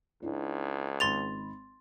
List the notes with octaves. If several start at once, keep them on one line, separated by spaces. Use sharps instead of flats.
C#2 D4 E4
G#1 D#4 B5 C6 A6 F7